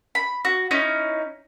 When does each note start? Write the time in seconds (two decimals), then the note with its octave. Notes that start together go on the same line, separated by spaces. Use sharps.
0.15 B5
0.45 F#4
0.71 C#4 D#4 E4